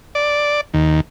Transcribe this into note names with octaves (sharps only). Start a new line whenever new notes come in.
D5
D#2